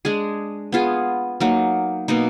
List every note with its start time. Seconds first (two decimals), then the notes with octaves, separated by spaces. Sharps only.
0.05 G#3 D4 G#4
0.72 B3 F4 G#4
1.40 F#3 A#3 D#4
2.08 B2 A#3 D#4